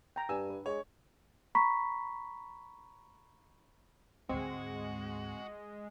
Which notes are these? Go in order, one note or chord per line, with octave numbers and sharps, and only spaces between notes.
G5 A#5
G2 D4 G#5 E6
B4
G#3 C#5
A#5 B5 C#6 B6
D2 G#2 G#3 C4 F#4